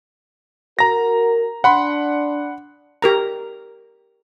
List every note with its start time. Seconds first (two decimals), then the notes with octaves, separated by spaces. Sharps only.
0.79 F#4 A#4 A#5 A#6
1.64 D4 F#5 B5 C6
3.02 G4 A#4 A#5